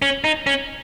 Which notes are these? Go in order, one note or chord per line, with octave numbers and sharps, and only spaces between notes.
C#4
D#4
C#4